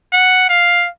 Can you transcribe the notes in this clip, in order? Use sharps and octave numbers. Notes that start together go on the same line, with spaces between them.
F#5
F5